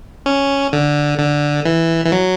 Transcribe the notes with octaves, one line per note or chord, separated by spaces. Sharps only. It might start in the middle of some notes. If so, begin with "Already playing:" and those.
C#4
D3
D3
E3
E3
F#3